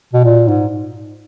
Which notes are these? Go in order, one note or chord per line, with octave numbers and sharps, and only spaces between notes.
B2
A#2
G#2